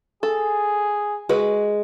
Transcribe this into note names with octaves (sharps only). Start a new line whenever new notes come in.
G#4 A4
G#3 F#4 B4